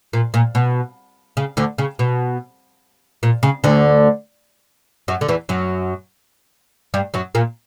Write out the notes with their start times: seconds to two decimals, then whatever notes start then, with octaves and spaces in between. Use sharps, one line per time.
0.13 A#2
0.34 A#2
0.55 B2
1.37 C#3
1.57 D2 D3
1.78 C#3
1.99 B2
3.23 A#2
3.43 C#3
3.64 D2 D3
5.08 F#2 F#3
5.21 D3
5.28 E2 E3
5.49 F#2 F#3
6.94 G2 G3
7.14 F#2 F#3
7.35 A#2 A#3